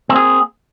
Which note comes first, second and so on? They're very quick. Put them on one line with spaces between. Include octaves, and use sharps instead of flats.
C4 A#3 G#4